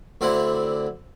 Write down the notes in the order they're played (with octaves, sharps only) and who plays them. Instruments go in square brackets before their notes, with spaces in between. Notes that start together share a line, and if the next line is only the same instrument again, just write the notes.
[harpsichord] D2 D3 C4 E4 F#5